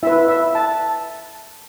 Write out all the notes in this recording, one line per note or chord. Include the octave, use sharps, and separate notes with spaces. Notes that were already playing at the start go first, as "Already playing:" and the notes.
E4 B4 E5
E5
A5